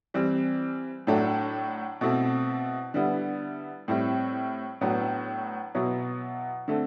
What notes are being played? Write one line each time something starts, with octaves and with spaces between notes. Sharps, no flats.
E3 G3 C4
A2 F#3 A3 D4
B2 A3 C4 E4
D3 G3 B3 E4
A2 G3 C4 E4
A2 F#3 B3 D4
B2 F#3 B3 E4
D3 A3 C4